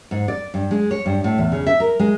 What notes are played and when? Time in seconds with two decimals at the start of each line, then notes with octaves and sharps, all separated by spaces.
0.11 G#2
0.28 D5
0.54 G2
0.71 G#3
0.91 C#5
1.06 G2
1.24 A2
1.38 E2
1.52 C#3
1.67 E5
1.80 A#4
1.99 G#3